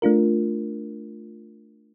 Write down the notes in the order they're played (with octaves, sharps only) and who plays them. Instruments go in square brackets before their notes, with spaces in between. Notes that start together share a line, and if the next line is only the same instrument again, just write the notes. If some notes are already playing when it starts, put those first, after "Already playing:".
[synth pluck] A3 D4 F4 A#4